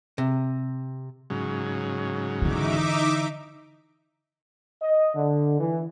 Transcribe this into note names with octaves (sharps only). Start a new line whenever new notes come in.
C3
G#2 C#3 F#3
D3 E3 D#4 E5 D6
D#5
D3
E3